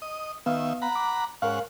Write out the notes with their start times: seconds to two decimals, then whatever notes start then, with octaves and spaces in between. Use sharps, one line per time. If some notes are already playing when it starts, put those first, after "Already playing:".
0.02 D#5
0.46 D#3 B3 E5 F5
0.82 F#5 A#5 B5
0.96 D6
1.42 G#2 C#4 A#4 F5 F#5